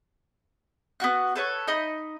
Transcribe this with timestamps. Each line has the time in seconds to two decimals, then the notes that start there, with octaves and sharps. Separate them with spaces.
1.00 B3 D#4 F#4 F#6
1.36 A4 B4 C#5
1.67 D#4 D#5 B5